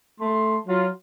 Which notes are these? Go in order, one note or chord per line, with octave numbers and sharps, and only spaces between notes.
A3 C6
F#3 F4